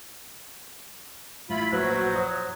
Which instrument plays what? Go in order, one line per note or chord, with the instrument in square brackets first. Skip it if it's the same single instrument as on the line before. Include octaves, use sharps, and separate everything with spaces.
[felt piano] A1 [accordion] E4 F4 B5
[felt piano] A#1 B4 E6 [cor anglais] F#3 [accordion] F#4 [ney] C5
[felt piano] C#5 D#6